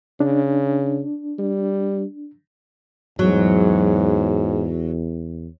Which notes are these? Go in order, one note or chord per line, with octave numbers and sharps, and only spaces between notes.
C#3 D4
G3
E2 G#2 F#3